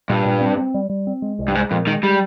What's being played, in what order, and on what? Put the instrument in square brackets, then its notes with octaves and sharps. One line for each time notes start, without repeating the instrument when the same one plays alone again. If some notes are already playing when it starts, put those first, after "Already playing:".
[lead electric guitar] G2 [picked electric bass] A#2
[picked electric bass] A#2
C4
C4
G3
G3
C4
G#3
C2
[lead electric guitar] G2
[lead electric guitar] G#2 [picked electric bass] G#3
[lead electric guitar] F2 [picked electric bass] A#2
[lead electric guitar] D#3 [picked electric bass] G#3
[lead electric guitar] G3 [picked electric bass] G#3